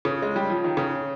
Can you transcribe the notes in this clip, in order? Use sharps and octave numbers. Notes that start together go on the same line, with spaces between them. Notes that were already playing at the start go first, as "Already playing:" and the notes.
C#3
G#3
G3
F3
D#3
C#3